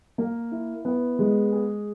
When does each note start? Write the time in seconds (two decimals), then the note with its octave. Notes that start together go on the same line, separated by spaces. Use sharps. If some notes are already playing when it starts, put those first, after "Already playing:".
0.18 A#3
0.51 E4
0.85 B3
1.19 G#3
1.52 G#4